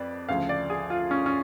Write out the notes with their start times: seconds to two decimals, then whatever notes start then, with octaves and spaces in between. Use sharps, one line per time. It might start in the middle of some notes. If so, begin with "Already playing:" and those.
Already playing: F2 B4 D5
0.29 D2 C#3 F3 F5
0.49 D5
0.70 G#4
0.90 F4
1.11 C#4
1.26 C#4